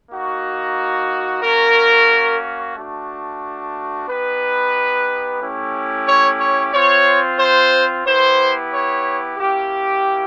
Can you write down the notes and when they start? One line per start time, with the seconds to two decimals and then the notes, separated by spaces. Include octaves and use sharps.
0.10 A#3 D#4 F#4
1.43 A#3 C#4 F#4 A#4
2.75 A3 D4 F#4
4.08 B3 D#4 G4 B4
5.41 A3 C#4 E4 G4
6.07 C#5
6.40 C#5
6.73 C4 F4 C#5
7.40 C5
8.06 B3 E4 G4 C5
8.73 C#5
9.38 A#3 C#4 E4 G4